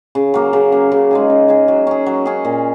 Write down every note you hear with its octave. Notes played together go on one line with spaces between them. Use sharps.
C#3
F#3 A#3
C#3
F#3 A#3
C#3
G#3 D#4 G#4
C#3
G#3 D#4 G#4
F#3
C#4 G#4
F#3
C#4 G#4
A#2